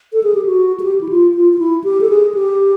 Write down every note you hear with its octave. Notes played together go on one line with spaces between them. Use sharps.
A4
G#4
G4
F#4
G#4
G4
E4
F4
F4
F4
E4
G4
A4
G#4
G4